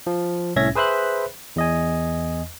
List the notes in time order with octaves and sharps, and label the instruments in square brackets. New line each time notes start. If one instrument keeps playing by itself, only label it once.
[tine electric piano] F3
C2 A2 C#4 E5 G#6 A#6
G#4 B4 C5 E5 B5 F#6
E2 D#5 G#5